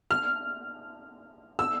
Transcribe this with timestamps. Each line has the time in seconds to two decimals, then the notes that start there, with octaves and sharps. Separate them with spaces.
0.11 F6
1.59 E6